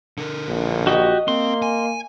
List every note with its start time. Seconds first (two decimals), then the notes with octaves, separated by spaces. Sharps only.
0.18 D3 A#4
0.48 A#1
0.87 F#4 G4 D#5
1.28 A#3 C4 C6
1.62 G#5